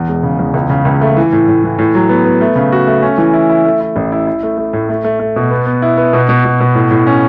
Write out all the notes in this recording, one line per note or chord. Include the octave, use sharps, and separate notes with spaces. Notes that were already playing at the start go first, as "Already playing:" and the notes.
Already playing: E2
E1
C#3
E2
C#2
C#3
C#2
A3
E3
A2
A2
E3
A2
F#3
B3
B3
A3
C#3
F#4
A3
C#4
E3
E4
E4
A3
E4
A1
E4
E4
A3
A3
A2
A3
A3
A3
B2
B3
B3
E4
B3
B2
B2
B2
B2
A2
A2
C#4